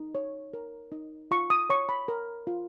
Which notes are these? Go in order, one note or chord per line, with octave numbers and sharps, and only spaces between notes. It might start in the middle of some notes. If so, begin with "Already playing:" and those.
Already playing: D#4
C#5
A#4
D#4
F4 C#6
D#6
C#5 C#6
B5
A#4
F4